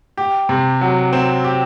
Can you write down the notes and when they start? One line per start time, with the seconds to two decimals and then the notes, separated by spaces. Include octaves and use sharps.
0.17 G4
0.49 C3
0.81 F#3
1.13 C4
1.44 G4